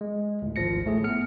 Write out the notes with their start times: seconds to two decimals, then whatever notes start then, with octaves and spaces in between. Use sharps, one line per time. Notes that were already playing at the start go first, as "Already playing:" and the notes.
0.01 G#3
0.42 D2 A2
0.56 G#1 F3 A#6 C#7
0.85 A2 A3 G#4
1.04 B3 F6 C#7